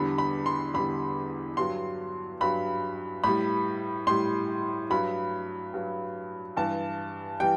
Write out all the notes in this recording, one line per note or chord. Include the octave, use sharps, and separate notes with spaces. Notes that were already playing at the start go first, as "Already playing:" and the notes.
Already playing: E2 D3 G3 B5
B5
C6
E2 D3 G3 B5
G2 F#3 C6
G2 F#3 B5
A2 G3 B5
A2 G3 C6
G2 F#3 B5
G2 F#3
G2 E3 G3 A5
E3 G3 G5